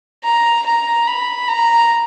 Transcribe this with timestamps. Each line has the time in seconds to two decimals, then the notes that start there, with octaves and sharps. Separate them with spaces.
0.24 A#5
0.66 A#5
1.07 B5
1.49 A#5